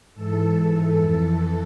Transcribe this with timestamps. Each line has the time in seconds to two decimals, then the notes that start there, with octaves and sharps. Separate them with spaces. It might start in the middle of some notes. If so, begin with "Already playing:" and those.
0.14 G#2 E3 A4
0.55 G#2 E3 A4
0.97 F2 E3